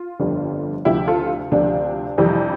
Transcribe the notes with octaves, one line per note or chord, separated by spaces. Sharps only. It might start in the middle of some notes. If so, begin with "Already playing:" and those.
Already playing: F4
G1 F2 D3 G3
D2 C3 F3 E4 G4
F4 A4
D2 C3 F3 D4
F2 C3 E3 G3